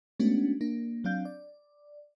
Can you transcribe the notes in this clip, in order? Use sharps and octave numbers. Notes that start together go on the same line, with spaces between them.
G#3 A3 B3 C#4 D4 F#4
A#3 D4
F#3 C4 D4 F5 G6
D5